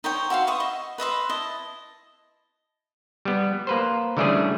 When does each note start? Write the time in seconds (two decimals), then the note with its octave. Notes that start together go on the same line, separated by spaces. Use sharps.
0.04 D#4 C5 C#5 G5
0.30 F#4 E5 F5 C6
0.47 B4 E5 C#6 D#6
0.60 D#5
0.98 B4 D#5 E5 C6
1.29 E4 D#5 A5
3.25 G3 B3
3.67 A#3 B4 C5
4.17 D3 E3 G3 A3 C#4 G#4